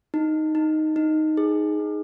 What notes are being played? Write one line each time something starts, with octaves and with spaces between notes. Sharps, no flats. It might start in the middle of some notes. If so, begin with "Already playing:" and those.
D#4
D#4
D#4
G#4
D#4